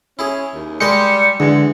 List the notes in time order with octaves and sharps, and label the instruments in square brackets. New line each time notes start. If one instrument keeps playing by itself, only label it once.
[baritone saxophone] C#4 [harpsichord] E4 G#4
[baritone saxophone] D#2
[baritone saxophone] G3 [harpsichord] G#3 A#4 C6 [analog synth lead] G6 [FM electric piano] C#7
[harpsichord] E2 [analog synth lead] D3 [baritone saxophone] G#3